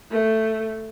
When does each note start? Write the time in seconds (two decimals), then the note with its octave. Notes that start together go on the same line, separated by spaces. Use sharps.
0.11 A3